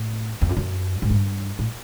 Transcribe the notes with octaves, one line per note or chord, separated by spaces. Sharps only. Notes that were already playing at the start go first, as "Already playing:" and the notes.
Already playing: A2
E2
F2
F#2
G#2
G2
A2